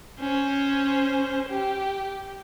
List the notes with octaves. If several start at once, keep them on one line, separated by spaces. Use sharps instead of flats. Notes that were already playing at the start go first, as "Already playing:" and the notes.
C#4 C5
G4